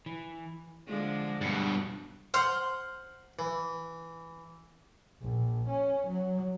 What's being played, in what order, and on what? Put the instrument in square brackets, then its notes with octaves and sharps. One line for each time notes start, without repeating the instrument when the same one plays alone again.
[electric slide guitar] E3
[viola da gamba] D3 F3 G#3
[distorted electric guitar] G2 B2
[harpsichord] C5 F#5 [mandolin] C6 F6
[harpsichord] E3
[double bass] A#1
C#4
F#3